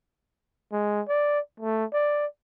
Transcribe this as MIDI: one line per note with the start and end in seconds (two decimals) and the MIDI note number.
0.72 1.01 56
1.08 1.40 74
1.60 1.85 57
1.93 2.26 74